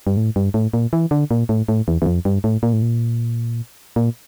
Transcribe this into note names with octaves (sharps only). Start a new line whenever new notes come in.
G2
A2
G2
A2
A#2
E3
D3
A#2
A2
A2
E2
E2
F2
G2
A2
A#2
A2
A#2
A#2